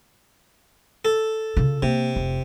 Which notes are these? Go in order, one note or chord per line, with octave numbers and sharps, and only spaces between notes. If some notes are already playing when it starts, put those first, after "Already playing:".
A4
C#3 F4
C3 A#3
F1